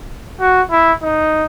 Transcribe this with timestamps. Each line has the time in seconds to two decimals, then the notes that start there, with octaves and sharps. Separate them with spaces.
0.40 F#4
0.71 E4
1.02 D#4